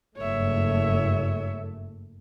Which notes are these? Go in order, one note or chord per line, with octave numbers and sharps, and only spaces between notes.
F#1 G2 A3 C#5 E5